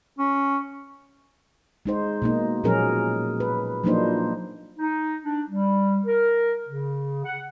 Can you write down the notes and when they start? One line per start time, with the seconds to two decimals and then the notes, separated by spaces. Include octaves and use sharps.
0.18 C#4
1.86 G#3 D#4 C5
2.22 B2 A#3 D#4
2.64 A#2 F3 F#3 C#4 G#4 A#4
3.40 B4
3.83 F3 F#3 A#3 D4 D#4 C5
4.79 D#4
5.24 D4
5.49 G3
6.06 A#4
6.68 C#3
7.25 F#5